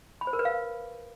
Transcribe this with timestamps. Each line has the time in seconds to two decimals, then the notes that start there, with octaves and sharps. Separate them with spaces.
0.21 B5
0.27 C5
0.33 A#4
0.39 B4
0.45 F5